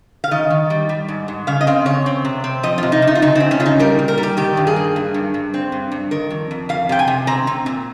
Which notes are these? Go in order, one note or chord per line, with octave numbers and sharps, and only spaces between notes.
F5
D#3 D#5
D#3
G3
G3
G#2
G#2
C#3 F5
D#5
C4 F5
C#3 C#5
C4
C3
C4
F3 D#5
C3 F4
D#4
C3
D#4
F4
C#3 D#4
C#3 C4
C#4
C#3 F4
D#4
G3 A#4
A#2
A#4
G3
G4
D#3 G4
G2
G#4
A#3
G2
G2
G2
C4
G2
G2
D#3 A#4
F2
F2
F2 F5
C3 G5
G#5
C3
C4 A#5
C4
A#2